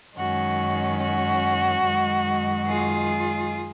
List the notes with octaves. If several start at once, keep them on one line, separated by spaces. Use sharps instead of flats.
F#2 D#3 G#3 C#4 F#4
F#4
F#2 D#3 G#3
F4 G#4